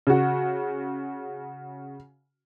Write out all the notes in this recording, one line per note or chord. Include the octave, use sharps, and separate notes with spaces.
C#3 F#4